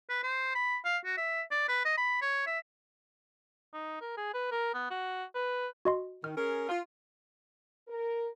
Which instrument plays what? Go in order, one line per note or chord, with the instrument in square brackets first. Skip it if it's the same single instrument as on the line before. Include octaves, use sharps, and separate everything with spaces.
[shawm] B4
C5
B5
F5
F#4
E5
D5
B4
D#5
B5
C#5
E5
[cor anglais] D#4
A#4
G#4
B4
A#4
B3
F#4
B4
[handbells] F#4 D#5 C6
[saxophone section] D#3 [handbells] F6
[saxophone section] C#4 G#4 A#4
F4
[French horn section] A#4